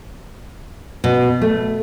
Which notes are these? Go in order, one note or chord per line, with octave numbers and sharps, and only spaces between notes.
B2
A3